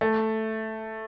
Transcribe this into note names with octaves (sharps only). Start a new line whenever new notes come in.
A3